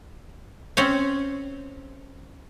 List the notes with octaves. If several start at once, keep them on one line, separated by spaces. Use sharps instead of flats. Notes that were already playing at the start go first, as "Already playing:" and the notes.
C4 C#4 C#5